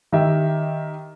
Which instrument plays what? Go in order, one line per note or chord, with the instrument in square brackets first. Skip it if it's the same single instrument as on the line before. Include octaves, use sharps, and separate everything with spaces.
[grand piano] D#3 G4 E5